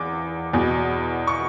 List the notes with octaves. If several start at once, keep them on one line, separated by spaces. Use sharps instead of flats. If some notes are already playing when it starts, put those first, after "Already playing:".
Already playing: E2 D6
E2 B2
C#6